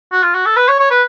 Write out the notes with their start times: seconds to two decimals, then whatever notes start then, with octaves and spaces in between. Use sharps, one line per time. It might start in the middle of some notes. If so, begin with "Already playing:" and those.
0.12 F#4
0.23 F4
0.34 F#4
0.46 A4
0.56 B4
0.68 C#5
0.80 C#5
0.91 B4